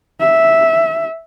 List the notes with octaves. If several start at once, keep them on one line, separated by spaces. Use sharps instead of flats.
E5